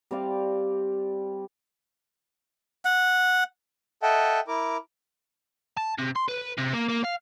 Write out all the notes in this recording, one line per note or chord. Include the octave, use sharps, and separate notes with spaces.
G3 C4 D5 F5
F#5
A4 D#5 E5 F#5 G5 A5
E4 A#4 D6
A5
C3
C6
B4
C3
A#3
A#3
F5